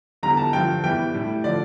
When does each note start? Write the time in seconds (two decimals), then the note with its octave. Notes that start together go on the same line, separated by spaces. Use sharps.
0.23 E2 D3 G3 A#5
0.37 A5
0.53 G2 D3 F3 G5
0.83 E2 E3 G3 G5
1.14 A2 G3
1.44 D3 F3 D5